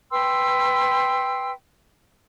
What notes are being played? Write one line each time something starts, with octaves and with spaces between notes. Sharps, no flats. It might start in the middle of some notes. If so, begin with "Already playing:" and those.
B4 G5 C6 E6